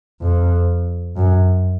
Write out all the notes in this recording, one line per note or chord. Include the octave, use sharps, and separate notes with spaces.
F2
F#2